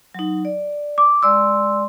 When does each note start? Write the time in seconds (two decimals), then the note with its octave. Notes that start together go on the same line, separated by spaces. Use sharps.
0.14 F#3 D#4
0.45 D5
0.98 D6
1.23 G#3 D5 C6 E6